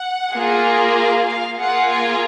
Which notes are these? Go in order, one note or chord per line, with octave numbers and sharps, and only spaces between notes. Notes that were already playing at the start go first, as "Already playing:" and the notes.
Already playing: F#5
A#3 F4 G#4
F5
F5
A#3 F4 G#4 F#5
G#5